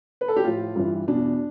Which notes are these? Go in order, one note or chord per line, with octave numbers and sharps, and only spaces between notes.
B4
A4
G4
A2 F3 F4
G2 E3
E2 B2 D4